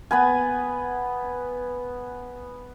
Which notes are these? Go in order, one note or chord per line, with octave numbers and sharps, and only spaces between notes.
B3 B4 G#5